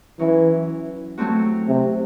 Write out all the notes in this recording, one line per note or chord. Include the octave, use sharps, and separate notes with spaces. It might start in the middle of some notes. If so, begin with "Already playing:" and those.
E3 F#3 C#4 E4
F#3 A3 C4 F#4
C3